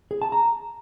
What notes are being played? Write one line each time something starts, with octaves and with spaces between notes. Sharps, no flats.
G#4
A5
A#5